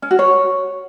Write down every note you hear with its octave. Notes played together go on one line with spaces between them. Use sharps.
C#4
F#4
C#5